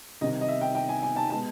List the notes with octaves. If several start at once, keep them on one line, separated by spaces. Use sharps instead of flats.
C2 C3 D#3 D#5
D#5
E5
G5
G5
G#5
G#5
A5
B2 G#3 B3 A5